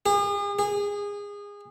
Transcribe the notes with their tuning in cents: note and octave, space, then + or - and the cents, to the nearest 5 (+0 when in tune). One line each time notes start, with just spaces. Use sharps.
G#4 -40
G#4 -25